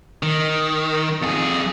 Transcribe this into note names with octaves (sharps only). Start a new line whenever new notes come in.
D#3
F2 G#4